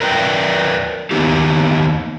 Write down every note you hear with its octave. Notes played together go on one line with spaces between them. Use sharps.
A#4 B4 D5 F#5 G5
D#3 A#3 B3 D#4 G4